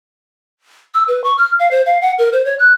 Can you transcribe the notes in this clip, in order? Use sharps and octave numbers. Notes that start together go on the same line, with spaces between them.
E6
B4
C#6
F6
F5
C5
F5
F#5
A#4
C5
C#5
F#6